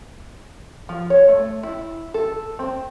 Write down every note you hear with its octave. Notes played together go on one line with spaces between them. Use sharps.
F3
C#5
A3
E4
A4
C4